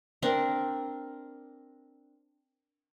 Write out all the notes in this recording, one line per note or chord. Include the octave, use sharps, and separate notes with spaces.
C4 D4 A#4